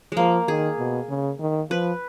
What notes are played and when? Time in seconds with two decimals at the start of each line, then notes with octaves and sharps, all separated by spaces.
0.12 F3 G#3 A#3
0.48 D#3 G#4
0.78 B2
1.09 C#3
1.40 D#3
1.70 F3 B4